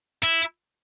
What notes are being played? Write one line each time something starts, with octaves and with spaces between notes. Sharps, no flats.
E4